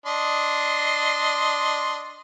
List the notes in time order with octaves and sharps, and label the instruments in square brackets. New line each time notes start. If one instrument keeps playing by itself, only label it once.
[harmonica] D4 D#5 C6